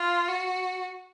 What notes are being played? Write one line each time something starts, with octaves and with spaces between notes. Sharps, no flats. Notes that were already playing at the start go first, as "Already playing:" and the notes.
Already playing: F4
F#4